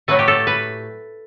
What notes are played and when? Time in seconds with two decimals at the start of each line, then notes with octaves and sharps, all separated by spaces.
0.08 A2 F#3 A3 B4
0.19 G4
0.28 A4
0.47 B4